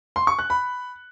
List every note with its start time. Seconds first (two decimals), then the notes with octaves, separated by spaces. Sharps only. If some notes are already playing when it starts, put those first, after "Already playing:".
0.16 C6
0.27 C#6
0.39 F#6
0.50 B5